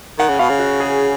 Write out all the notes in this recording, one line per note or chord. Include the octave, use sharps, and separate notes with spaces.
D#3 F#5
C#3
B2 F5
C#3
F#4
G#4